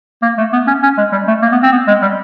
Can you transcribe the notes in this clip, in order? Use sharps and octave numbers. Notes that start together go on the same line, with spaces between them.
A#3
A3
B3
C#4
C#4
G#3
G3
A3
A#3
B3
C4
B3
G#3
G3